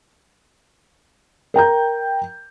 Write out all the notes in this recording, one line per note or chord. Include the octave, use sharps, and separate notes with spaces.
A#4 G5 A#5 G6